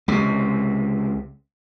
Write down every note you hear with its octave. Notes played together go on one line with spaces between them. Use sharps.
C#2 C3